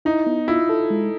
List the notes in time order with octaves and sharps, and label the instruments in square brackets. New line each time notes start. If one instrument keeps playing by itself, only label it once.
[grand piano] D#4 [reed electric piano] E4
[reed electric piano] B3
[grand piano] E4 [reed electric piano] F4
[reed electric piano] A4
G#3